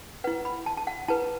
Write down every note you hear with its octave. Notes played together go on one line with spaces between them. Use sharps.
E4 B4 F#5
B5
A5
A5
F#5
E4 B4 A5